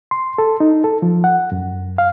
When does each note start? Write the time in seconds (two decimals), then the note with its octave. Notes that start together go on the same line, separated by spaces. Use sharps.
0.11 C6
0.38 A4
0.60 D#4
0.84 A4
1.02 F3
1.24 F#5
1.52 F#2
1.98 F5